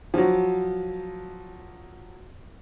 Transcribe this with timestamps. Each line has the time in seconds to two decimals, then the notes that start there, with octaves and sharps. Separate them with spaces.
0.14 F3 F#3